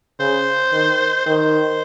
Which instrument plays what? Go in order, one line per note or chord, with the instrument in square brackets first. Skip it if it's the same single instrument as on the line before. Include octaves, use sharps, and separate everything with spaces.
[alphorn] C#3 [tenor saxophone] C5
[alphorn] D#3
[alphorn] D#3 [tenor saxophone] C5